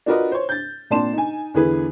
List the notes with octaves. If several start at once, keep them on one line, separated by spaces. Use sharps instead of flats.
D4 F4 F#4 A#4 B4 D#5
C5 C#5
G6 A6
A#2 C4 D4 A5 C6 E7
D#4 G#5
E2 D3 E3 B3 G#4 B4